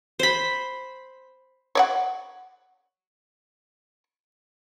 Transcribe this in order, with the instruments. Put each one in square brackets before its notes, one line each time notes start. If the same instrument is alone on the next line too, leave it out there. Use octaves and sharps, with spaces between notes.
[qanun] C5 B5
[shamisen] C#5 D5 F#5